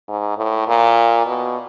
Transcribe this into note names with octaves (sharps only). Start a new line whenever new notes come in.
G#2
A2
A#2
B2